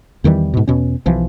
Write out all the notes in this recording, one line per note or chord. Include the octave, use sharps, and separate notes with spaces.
E2 D#3 E3 G3
G#2 B2
E2 B2 C#4
B1 E3 F3